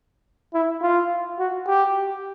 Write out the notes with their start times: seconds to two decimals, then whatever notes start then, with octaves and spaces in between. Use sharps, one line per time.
0.54 E4
0.82 F4
1.39 F#4
1.67 G4